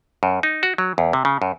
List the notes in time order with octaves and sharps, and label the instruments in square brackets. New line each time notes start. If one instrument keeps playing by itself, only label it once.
[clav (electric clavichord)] F#2
D#4
F#4
F#3
E2
C3
C#3
F#2